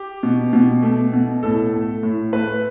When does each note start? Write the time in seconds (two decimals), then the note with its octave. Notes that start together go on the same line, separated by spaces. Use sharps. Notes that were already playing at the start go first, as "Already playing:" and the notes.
Already playing: G4
0.23 B2
0.53 B2
0.82 A3
1.13 B2
1.43 A2 A4
1.73 A3
2.03 A2
2.33 A3 B4